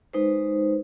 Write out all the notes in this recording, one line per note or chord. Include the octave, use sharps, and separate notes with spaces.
G#3 D#4 B4 C5